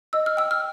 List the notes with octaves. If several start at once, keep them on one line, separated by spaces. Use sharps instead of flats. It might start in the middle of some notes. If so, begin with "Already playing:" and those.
D#5 E6
F6
G5 E6
F6